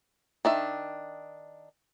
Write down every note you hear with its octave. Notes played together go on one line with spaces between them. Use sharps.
D#3 D4 E5